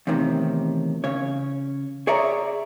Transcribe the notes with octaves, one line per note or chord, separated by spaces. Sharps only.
E2 A2 C3 D#3
C#3 C#4 C#5
G#4 C#5 D5 E5 A#5